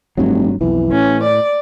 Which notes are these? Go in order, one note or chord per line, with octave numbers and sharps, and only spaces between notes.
F1 G2 F#3
B1 F2 E3
A2 C#4
D5